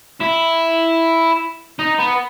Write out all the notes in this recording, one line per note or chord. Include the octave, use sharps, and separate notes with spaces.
E4
D#4
B3